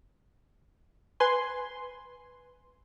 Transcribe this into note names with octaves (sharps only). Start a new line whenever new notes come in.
B4 G#5 C6